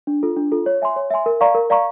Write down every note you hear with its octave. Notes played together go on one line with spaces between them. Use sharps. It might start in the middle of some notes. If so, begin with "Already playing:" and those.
D4
F4 A4
D4
F4 A4
C#5
E5 G#5 C6
C#5
E5 G#5 C6
A#4
D5 F5 A#5 C#6
A#4
D5 F5 A#5 C#6